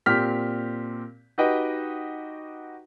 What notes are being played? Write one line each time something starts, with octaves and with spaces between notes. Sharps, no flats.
A#2 C4 G4 F6 B6
D#4 F#4 G4 B4 D#5 G5